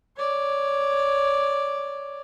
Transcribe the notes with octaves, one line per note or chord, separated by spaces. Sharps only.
C#5 D5